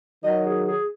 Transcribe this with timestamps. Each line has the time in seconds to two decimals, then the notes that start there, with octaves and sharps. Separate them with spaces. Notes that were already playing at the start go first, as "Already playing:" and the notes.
0.23 D#3 F#3 D#5
0.46 G#4
0.68 G#4